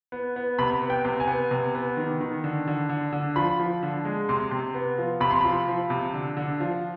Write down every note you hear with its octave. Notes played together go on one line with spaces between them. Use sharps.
B3
B3
C3 B5
B3
G5
C3
G#5
B3
C3
B3
D#3
D#3
D3
D3
D3
D3
F3 B5
F3
D3
G#3
C3 C6
C3
B3
F3
C3 B5
C6
F3 B5
F3
C3
D3
D3
F3